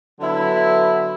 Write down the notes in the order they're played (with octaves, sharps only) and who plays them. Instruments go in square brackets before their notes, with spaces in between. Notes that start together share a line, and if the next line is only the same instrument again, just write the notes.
[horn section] D3 F#3 B3 E4